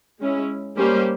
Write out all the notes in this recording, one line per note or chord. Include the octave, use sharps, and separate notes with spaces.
G#3 C#4 E4
G3 A#3 C#4 G4 C5